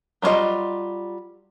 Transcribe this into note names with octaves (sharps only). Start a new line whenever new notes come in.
F#3 G3 A3 F4 D#5